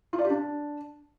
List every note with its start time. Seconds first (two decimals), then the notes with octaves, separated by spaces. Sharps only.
0.13 F4
0.19 D5
0.24 G4
0.30 D4